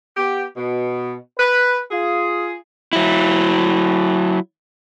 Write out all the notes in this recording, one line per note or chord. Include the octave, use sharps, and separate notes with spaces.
B3 G4
B2
B4
F4 G#4
F#3 E4